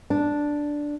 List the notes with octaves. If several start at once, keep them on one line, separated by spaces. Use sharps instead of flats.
D4